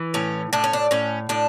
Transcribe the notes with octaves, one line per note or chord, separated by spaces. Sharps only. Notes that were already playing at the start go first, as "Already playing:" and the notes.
Already playing: E3
A2 C#4
A2 D4
C#4
D4
A2 C#4
A2 D4